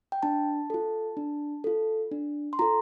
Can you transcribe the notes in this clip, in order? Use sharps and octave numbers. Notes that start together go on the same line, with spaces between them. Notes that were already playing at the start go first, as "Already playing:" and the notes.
G5
D4 A5
F4 A4
D4
F4 A4
D4
C6
F4 A4 A#5